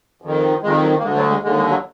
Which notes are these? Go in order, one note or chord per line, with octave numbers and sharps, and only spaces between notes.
F2 D#3
F2 D#3 G#3
F#3
A#3
D2 D3 G#3
F#3
G#3
D#2 D3 G#3
G#3
F#3